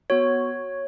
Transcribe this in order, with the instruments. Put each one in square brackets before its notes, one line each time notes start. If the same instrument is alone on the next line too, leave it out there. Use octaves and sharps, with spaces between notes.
[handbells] B3 F#4 C#5